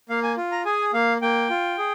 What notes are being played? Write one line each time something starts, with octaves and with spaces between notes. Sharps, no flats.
A#3 F5
G#5
F4
A#5
G#4 G#5
A#3 F5
A#3 G5
F4
G#4